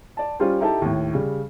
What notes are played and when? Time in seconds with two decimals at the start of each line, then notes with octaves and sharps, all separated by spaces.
0.17 D5 A5
0.39 G3 C#4 F4 G4 C5
0.60 D#4 E4 G4 A4 A5
0.82 D#2 A2
1.13 C#3 G3